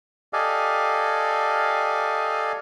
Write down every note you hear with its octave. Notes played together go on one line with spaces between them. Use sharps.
G4 A4 D5 D#5 F5 G#5